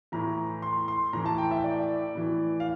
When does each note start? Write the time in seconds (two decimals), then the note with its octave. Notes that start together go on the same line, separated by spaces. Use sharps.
0.12 A2 E3 A#5
0.62 C6
0.88 C6
1.13 A2 E3 A#5
1.26 A5
1.38 G5
1.51 E5
1.64 D5
2.15 A2 E3
2.60 F5